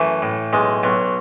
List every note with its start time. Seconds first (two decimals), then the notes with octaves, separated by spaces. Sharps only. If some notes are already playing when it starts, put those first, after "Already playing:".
Already playing: F#2 E3 A3
0.22 A2
0.53 B1 G#3
0.83 B1 F#3